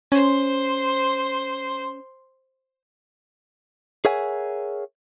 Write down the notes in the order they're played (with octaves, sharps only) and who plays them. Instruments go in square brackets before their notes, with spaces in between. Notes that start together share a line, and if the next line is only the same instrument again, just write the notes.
[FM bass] C#4 [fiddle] C5 C6
[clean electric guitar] G#4 A#4 C#5 E5 F#5 G#5